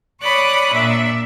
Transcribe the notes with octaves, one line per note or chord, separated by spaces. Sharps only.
C#5 D5 B5 D#6 F#6
A#2 D4 E5